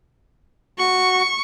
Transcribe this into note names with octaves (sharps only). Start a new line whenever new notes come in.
F#4 C#6